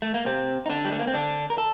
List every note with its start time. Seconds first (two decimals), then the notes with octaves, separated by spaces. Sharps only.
0.02 A3
0.14 A#3
0.26 C3 C4
0.66 D#4
0.70 D3 D4
0.85 G3
0.92 A3
0.99 A#3
1.07 C4
1.14 D3 D4
1.50 A#4
1.58 A4